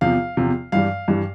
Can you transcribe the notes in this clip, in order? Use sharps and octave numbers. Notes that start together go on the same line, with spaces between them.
E2 C3 F3 F5
E2 C3 F3
G2 E3 G3 F5
G2 E3 G3